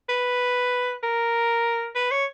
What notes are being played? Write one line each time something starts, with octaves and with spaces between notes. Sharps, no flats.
B4
A#4
B4
C#5